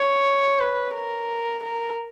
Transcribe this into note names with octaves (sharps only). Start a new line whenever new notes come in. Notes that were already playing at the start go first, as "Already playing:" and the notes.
Already playing: C#5
B4
A#4
A#4